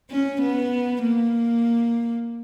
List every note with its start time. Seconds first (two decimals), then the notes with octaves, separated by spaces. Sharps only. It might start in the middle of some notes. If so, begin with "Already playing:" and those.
0.11 C#4
0.41 B3
1.03 A#3